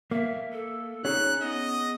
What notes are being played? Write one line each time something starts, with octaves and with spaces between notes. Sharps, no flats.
A#3 E5
A4
C#4 D#4 G#4 F#6
B3 D#5